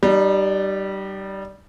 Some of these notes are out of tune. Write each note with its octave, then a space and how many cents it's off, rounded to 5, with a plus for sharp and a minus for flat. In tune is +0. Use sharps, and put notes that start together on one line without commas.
G3 -15 D#4 -45